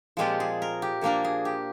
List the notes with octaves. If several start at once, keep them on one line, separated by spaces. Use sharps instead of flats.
A#2 F3 G#3 C4 F4 G4
G#4
A#4
G4
A#2 F3 A#3 D4 A#4
G#4
G4